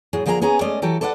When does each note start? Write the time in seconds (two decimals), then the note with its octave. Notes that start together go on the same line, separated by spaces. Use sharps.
0.13 A2 F#3 G#4
0.26 D3 F3 A#3 G#4 G#5 A#5
0.41 B3 C#4 G#4 G#5 A#5
0.61 G#3 A3 C#4 D5 D#5
0.82 E3 F#3 G4 A4
1.01 A4 B4 D5 D#5 F#5